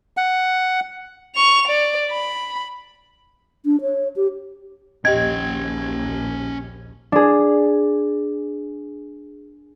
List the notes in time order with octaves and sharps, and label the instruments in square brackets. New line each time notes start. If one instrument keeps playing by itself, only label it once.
[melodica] F#5
[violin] C#6 F7
D5
B5
[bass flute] D4
C#5
G4
[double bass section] A#1 D#2 [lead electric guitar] C#4 G5 [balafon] G4 D#5 [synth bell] G#6
[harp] D4 G#4